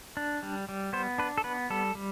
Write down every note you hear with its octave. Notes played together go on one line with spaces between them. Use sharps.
D4
G3
G3
B3 C5
D4 B4
A4
B3 B4
G3 A4
G3